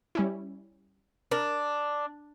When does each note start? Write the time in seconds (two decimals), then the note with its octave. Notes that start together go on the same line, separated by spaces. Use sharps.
0.15 G3 C#4 E4
1.31 D4 A#4